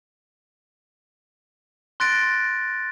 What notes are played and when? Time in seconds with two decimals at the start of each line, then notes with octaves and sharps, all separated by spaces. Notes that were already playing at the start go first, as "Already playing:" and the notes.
2.00 C6 F#6 A6 A#6 D7